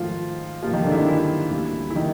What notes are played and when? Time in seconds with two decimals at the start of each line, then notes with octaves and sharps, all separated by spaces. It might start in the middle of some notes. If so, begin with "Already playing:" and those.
Already playing: G#2 D#3 F3 F#3 A3 F4
0.62 G2 D#3 F3 G3 A#3 F4
0.73 D#3 D#4
0.85 D3 D4
0.92 E4
0.96 D#3 D#4
1.06 E3 E4
1.51 D2 D3 G3 A#3
1.90 E4
1.96 D#3 D#4